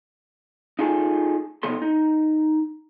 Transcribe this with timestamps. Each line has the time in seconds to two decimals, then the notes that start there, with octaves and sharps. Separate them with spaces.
0.79 D#4 F4 G#4 A4
1.63 C3 B3 D#4 A4 C6
1.82 D#4